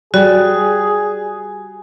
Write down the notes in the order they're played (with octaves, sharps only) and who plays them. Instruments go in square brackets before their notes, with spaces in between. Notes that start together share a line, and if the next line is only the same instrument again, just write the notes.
[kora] G3 [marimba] F#4 [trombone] G#4